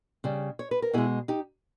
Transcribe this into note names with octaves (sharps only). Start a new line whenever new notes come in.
C#3 G3
C#5
B4
A#4
B2 G#3 E4 G#4
D#4 G4